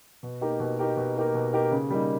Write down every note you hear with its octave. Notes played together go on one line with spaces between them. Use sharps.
B2
A#3 D#4 G4 A#4
B2
A#3 D#4 G4 A#4
B2
A#3 D#4 G4 A#4
B2
A#3 D#4 G4 A#4
C#3
G3 A#3 D#4